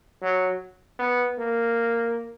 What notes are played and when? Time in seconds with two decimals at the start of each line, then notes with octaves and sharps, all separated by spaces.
0.22 F#3
0.99 B3
1.38 A#3